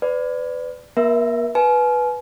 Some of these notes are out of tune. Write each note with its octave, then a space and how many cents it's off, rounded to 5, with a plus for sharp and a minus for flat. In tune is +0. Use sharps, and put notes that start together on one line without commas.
B4 +30 D5 +0
A#3 +40 A#4 +30 E5 -5
B4 -5 G#5 +40